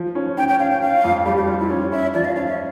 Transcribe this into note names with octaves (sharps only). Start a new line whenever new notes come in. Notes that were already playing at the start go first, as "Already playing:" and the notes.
Already playing: F3
C#4
C#4 G5
G5
C#4 F5
G5
C#4 F5
F2
G3 G4
G4
G3 F4
E4
C#4 F4
C#4 E5
F3 D5
F5
C#4 F5
E5